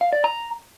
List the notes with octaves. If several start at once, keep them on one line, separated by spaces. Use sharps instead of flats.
F5
D5
A#5